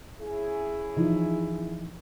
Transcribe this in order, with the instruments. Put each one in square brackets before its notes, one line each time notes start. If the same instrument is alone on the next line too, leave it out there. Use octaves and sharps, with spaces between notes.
[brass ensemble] C#4 E4 G#4
[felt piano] E3 F3 D#4